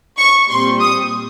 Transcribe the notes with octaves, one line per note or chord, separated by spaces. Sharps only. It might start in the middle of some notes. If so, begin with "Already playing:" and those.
C#6
A#2 G3 C4 C6
D#6